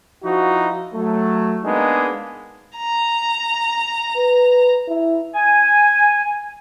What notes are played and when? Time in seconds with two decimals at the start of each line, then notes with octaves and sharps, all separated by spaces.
0.23 F3 D#4 E4 F#4
0.94 F#3 A3
1.65 G#3 A#3 B3 D4 D#4 G#4
2.75 A#5
4.16 B4
4.88 E4
5.34 G#5